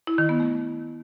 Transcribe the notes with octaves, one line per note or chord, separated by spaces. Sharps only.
E4
D#3
B3
A3